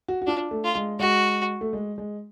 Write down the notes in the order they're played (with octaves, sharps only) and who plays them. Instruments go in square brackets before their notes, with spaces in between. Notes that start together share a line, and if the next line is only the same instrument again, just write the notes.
[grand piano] F#4
F#4
[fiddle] D4 [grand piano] F4
[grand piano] A3
[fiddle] F4
[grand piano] G#3
[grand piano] G#3 [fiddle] F#4
[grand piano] A3
G#3
G#3